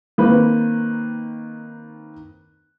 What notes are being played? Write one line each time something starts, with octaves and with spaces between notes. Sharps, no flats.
D#3 A#3 C4 B4